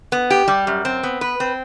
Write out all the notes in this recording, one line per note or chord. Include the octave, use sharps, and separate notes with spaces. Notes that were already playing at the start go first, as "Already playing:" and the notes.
B3
G4
G3
F#2
C4
B3
B4
C4